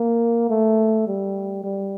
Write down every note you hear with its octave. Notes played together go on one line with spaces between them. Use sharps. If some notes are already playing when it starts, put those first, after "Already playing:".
Already playing: A#3
A3
G3
G3